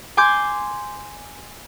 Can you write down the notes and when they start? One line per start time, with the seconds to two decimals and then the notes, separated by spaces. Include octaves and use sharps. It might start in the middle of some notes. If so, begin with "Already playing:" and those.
0.17 G#5 C6 D6 G6 G#6